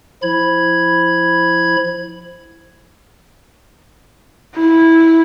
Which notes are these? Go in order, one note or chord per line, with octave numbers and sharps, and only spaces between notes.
F3 E4 B5 G#6
E4